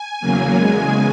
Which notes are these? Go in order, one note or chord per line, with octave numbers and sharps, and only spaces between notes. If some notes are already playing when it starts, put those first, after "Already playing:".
Already playing: G#5
E2 C#3 F#3 A#3
E2 C#3 G#3